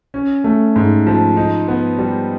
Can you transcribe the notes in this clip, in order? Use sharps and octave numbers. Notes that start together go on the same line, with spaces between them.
C#4
A3
G#2
F3
D#4
B3
G3